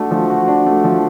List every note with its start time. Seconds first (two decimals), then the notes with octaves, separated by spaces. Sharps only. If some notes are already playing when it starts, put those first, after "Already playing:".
Already playing: A3 D4 F#4
0.11 F3
0.30 F#4
0.48 D4
0.66 A3
0.84 F3